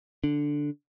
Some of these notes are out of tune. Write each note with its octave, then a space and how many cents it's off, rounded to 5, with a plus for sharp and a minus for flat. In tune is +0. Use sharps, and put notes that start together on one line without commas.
D3 +0 D4 +0